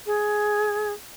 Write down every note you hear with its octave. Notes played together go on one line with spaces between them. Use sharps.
G#4